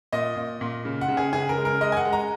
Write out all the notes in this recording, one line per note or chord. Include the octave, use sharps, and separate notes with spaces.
A#2 D#5
A#2
A#2
C#3
F#5
C#3
G#4
C#3 G#4
A#4
G#3
A#4
G#3 D#5
G#5
F#5
G#3
A#5